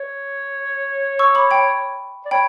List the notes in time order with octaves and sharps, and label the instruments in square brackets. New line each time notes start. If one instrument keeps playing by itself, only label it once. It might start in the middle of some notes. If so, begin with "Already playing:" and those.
Already playing: [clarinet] C#5
[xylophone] C#6 E6
B5 D6
G5 B5
[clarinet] D5
[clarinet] C#5 [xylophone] G5 B5